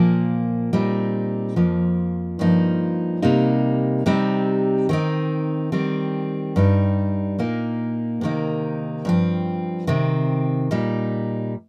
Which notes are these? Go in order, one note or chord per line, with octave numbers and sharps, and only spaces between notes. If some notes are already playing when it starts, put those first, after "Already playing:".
Already playing: A#2 F3 A#3
A#2 G3 C4 D#4
F2 F3 A#3
G2 F3 A#3 D#4
C3 G3 A#3 D#4
C3 G3 C4 D#4
D#3 C4 D#4
D#3 G3 C4
G2 G3 D#4
A#2 A#3 D#4
C3 D#3 A#3 D#4
G2 F3 C4
C3 D#3 C4
A#2 G3 D#4